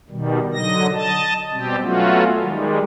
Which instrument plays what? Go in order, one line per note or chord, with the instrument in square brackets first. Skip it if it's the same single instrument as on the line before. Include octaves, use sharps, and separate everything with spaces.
[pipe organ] B2 D#3 G3
D3 F#3 D#5 A#6
D#5 A5
B2 G3 C4 G4
F#3 A3 B3 C#4 F4 F#4
D#3 G3 G#3